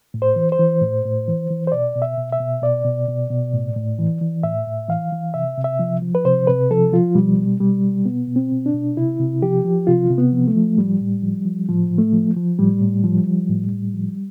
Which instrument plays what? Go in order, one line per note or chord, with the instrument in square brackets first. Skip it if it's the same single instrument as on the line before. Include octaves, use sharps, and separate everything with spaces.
[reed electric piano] A2
C5
E3
C5
E3
A2
A2
E3
E3
C5
B2 D5
B2
E5
B2
E5
B2
B2 D5
B2
B2
B2
A2
A2
E3
E3
A2 E5
A2
E3 F5
E3
C3 E5
C3
E5
F3
F3
B4
C3 C5
C3 B4
F3 A4
F3 F4
B2 G3
B2
B2 G3
B2
B2 B3
B2
C4
B2
D4
B2
C3 E4
C3
F3 G4
F3
C3 F4
C3
B3
F3
A3
F3
A2 G3
A2
F3
F3
A2 F3
A2
A3
F3
F3
A2 G3
A2
F3
F3
A2
A2
F3